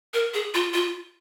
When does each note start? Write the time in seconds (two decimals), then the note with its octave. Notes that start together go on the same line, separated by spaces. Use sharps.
0.14 A#4
0.34 G#4
0.54 F4
0.73 F4